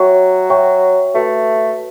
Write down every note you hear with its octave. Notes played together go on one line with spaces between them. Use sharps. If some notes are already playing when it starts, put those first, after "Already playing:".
Already playing: F#3 F#4 C#5 E5 G5 C#6
F#4 C#5 E5 G5 C#6
A3 F#4 B4 E5